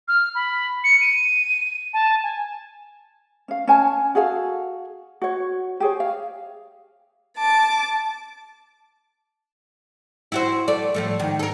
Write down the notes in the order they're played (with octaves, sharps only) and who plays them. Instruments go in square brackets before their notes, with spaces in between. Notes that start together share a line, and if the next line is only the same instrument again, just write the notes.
[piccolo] F6
B5
C#7
D#7
A5
G#5
[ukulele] C#4 F5
C#4 G#5 A5
F#4 G#4 A4 F5
F#4 C#5
G4 G#4 C#5
F5
[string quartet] A5 D6
[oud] E4 F#4 C5
A3 D5
A2 F3 A3
G#2 D#3
A4 A#4